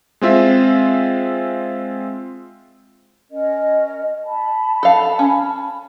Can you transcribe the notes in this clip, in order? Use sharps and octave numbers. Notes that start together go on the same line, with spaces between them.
G#3 C4 F4 E5
C#4 A#4 D#5
A5 B5
A4 F5
C#4